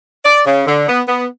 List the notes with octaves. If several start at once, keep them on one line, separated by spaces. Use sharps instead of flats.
D5
C#3
D3
B3
B3